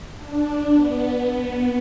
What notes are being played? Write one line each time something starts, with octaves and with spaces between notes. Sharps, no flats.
D4
B3
B3